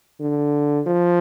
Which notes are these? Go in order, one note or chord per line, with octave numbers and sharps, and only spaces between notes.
D3
F3